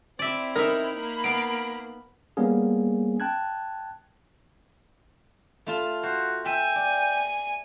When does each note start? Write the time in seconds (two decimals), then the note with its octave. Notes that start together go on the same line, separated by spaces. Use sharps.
0.19 C4 E4 D5 E5
0.56 D#4 A#4 E5
0.95 A#3 B5
1.24 B3 F5 D7
2.37 G3 A#3 B3 C#4 G#4
3.20 G5 A5 F#6 G#6
5.66 A3 F4 A5
6.03 F#4 C5
6.46 E5 G5 G#5
6.76 D5